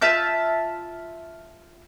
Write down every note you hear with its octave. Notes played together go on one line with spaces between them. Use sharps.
F4 E5 A5 G6